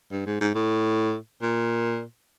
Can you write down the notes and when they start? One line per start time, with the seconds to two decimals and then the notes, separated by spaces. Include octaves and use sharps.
0.12 G2
0.26 G#2
0.41 G#2
0.55 A2
1.42 A#2